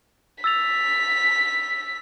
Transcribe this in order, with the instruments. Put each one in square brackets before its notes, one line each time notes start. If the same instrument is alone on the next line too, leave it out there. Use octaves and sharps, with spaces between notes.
[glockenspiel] E6 A6 F7 [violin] B6